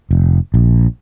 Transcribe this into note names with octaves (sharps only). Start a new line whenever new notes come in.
F1
A#1